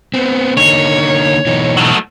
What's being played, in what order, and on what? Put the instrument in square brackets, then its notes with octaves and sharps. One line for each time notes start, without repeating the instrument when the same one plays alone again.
[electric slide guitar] B3 C4
[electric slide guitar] D3 A#3 D#4 [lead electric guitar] C#5
[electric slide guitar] B2 E3 D#4
[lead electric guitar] F#3 A3